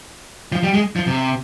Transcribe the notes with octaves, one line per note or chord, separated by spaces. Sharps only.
F3
G3
G#3
F3
C3